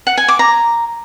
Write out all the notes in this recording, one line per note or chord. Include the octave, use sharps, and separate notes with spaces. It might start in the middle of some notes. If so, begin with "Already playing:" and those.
F#5
G#5
D6
A#5